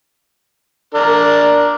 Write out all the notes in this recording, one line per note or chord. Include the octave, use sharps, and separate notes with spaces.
D4 A#4